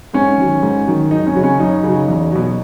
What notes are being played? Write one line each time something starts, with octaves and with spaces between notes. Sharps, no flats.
G#2 C#4
D#3 F#3
G#2
D#3 F#3
F#2 D#4
C#4
C#3 F#3
C#4
F#2 D#4
C#3 F#3
E2
B2 F#3